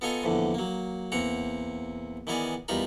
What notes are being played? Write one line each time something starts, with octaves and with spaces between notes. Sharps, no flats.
B3 F4 A4 D#5 G#5 A#5
A#1 E2 A2 D3
F#3 A#3
E2 A#3 C4 F#5 A#5
D#3 E3 B3 G#4 A#4 D5
E2 G3 D#4 F4 A#4 B5